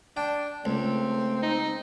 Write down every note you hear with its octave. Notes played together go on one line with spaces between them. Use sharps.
D4 G5
C#2 A3 C4
D#4